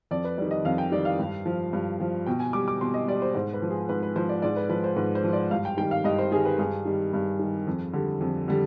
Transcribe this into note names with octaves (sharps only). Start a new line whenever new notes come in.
F2 D5
B4
D#3 G3 D5
D#5
F2 F5
G5
D#3 G3 D5
F5
G2
F3
G2
F3
B2 G5
G#5
G3 D6
D6
B2 C6
D#5
G3 D5
C5
G#2 C5
B4
F3
G#4
G#2 B4
B4
F3 C5
D5
G#2 D5
B4
F3 B4
C5
G#2 B4
C5
F3
D5
G2 F5
G5
D#3 G3 G5
F5
G2 D#5
C5
D#3 G3 G#4
B4
G2 G#4
D#3 G3
G2
D#3 G3
F2
D3 G3
F2
D3 G3